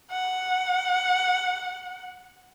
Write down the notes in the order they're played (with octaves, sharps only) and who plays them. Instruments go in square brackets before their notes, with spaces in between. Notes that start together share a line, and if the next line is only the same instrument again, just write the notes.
[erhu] F#5